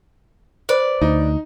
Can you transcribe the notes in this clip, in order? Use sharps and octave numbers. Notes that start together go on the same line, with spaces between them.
B4 C5 D5
D2 D#4